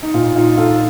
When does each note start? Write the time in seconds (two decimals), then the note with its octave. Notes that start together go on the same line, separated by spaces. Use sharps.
0.03 D#4
0.14 A#2 F4
0.36 D#4 F4
0.57 D#4 F4 A4